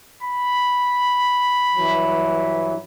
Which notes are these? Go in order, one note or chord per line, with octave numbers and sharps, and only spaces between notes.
B5
G2 E3 F#3